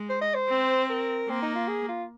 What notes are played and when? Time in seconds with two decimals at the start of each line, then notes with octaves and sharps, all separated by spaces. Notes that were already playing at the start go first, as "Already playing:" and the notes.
Already playing: G#3
0.09 C5
0.21 D#5
0.34 C5
0.49 C4
0.89 A#4
1.29 A#3 C4
1.42 D#4
1.55 F4
1.68 G#4
1.89 F4